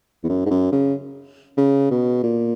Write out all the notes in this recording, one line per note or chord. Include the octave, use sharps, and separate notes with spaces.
E2
F#2
G#2
F#2
C#3
C#3
B2
A#2